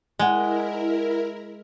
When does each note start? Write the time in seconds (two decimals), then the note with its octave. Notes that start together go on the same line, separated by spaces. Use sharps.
0.19 G#3 E4 A#4 D5 D#5 F#5